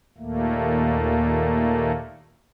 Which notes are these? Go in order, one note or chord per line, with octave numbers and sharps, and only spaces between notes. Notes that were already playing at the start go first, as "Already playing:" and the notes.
D#2 A#2 A3 A#3